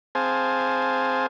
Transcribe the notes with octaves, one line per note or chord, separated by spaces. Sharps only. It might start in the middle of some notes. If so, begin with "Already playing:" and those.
C4 G#4 C5 F5 G#5 A5